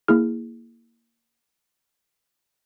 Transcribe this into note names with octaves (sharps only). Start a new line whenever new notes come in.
A#3 E4 G#4 F6